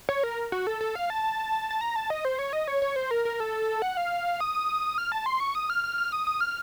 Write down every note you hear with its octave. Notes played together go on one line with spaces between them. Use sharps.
C#5
A#4
F#4
A4
A4
F5
A5
A5
A#5
A5
D#5
C5
C#5
D#5
C#5
C#5
C5
A#4
A#4
A4
F#5
F5
D#6
D#6
F6
A5
C6
C#6
D#6
F6
F6
F6
D#6
D#6
F6